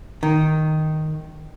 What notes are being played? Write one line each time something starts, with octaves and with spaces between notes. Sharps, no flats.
D#3